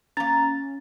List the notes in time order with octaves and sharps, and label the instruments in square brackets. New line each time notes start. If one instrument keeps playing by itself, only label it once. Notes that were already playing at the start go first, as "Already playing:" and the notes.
[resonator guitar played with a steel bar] A#3 A#5 [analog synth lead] C#4 [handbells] A6